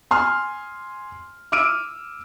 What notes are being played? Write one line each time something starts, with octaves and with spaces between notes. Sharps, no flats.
G#5 C6 D#6 F6
D6 E6 F6 D7 D#7